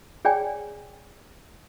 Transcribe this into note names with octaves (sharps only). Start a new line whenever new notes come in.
G#4 C#5 D5 G5 G#5